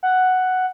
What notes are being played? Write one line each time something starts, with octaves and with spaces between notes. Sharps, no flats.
F#5